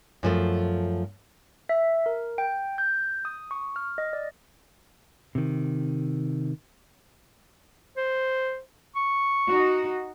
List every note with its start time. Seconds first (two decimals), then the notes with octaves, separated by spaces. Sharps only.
0.23 F#2 F3 A3
1.69 E5
2.06 A#4
2.38 G5
2.78 G6
3.25 D#6
3.51 C#6
3.76 F6
3.98 D#5
4.13 D5
5.35 C3 D#3
7.97 C5
8.96 C#6
9.48 D#4 F#4